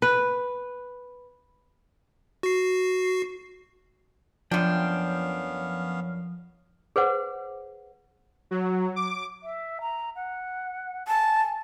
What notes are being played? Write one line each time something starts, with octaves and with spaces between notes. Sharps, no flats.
B4
F#4 C7
F#2 F3 B3 C#4 D4 F5 G5
G#4 B4 C5 F#5
F#3
D6
E5
A#5
F#5
G#5 A5